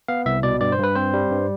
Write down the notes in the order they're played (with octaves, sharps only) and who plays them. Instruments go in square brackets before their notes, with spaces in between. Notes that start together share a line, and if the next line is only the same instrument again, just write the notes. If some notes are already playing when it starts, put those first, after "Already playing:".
[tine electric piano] B3 F5
C2 E5
B2 D5
G2 D5
C5
G2 B4
C4 C5
G3
G2